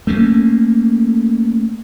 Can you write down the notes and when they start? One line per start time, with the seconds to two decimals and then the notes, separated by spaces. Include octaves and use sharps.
0.07 A3 A#3 C#4